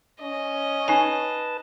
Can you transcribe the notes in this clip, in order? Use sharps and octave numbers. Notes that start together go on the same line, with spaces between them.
C#4 D#5
D#4 B4 G#5 A5